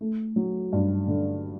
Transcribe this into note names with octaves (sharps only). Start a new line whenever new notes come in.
A3
F#3
G2
D3